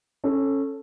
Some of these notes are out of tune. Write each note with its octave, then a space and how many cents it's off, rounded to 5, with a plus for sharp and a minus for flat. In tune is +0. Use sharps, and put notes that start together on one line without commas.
C#4 -15 A4 +0